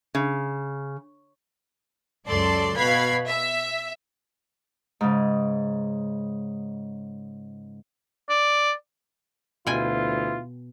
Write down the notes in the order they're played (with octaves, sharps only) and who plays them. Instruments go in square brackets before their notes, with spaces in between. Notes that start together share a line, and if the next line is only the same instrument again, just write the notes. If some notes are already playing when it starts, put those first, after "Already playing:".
[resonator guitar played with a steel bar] C#3
[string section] C#2 F#2 A4 D5 C6
B2 B4 F5 B5 G#6 C7
E5
[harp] G#2 C#3
[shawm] D5
[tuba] D2 [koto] B2 G5 G#5 [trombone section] E3 F4